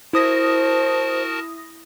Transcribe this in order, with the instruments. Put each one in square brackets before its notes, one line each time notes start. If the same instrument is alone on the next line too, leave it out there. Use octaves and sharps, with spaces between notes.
[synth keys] E4 D#6 A#6 [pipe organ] F#4 A#4 A5 [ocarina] C5